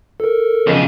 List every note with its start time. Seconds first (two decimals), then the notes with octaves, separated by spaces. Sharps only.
0.20 A4 A#4
0.67 B1 F2 C#3